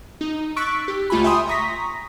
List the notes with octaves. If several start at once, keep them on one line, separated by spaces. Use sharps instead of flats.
D#4
C#6 E6 F#6 A6 B6 D7
G4
C#2 A3 F4 G#5 B5
E5 G5 G#5 C6 D#6
A#5 C#6 D#6 A#6 B6